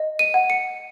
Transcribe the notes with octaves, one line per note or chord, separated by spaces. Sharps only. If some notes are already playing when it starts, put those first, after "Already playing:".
Already playing: D#5
D#7
F#5
C#7